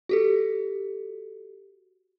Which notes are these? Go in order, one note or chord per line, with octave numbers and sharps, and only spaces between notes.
F#4 G4 A4